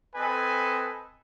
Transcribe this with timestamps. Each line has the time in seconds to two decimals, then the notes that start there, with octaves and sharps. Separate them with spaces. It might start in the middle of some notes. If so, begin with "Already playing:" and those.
0.15 C4 A4 B4 D#5 G#5